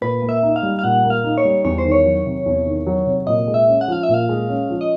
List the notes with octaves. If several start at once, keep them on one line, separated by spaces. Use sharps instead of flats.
A#2 B4
A#3
E5
D#4
F5
G3
F5
A#2 F#5
A#3
F5
D#4
C#5
G3
E2 C#5
C5
D#3
C#5
F#3
C3
E2
D#3
F#3
C3
A#2 D#5
G#3
E5
C#4
F#5
F3 F5
E5
A#2
F5
G#3
C#4
F3
D#5